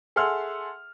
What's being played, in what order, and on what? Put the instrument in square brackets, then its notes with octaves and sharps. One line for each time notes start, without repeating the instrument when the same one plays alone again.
[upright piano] G#4 A4 E5 F#5 C6 F6